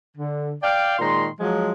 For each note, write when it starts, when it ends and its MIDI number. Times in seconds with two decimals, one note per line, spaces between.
0.17 0.52 50
0.63 0.95 74
0.63 0.95 77
0.63 0.95 79
0.99 1.27 46
0.99 1.27 51
0.99 1.27 56
0.99 1.27 82
0.99 1.27 84
1.40 1.72 53
1.40 1.72 54
1.40 1.72 56